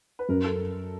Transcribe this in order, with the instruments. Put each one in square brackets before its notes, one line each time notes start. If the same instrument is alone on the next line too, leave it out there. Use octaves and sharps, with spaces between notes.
[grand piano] B4
[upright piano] F#2 [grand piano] A#4
[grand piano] A4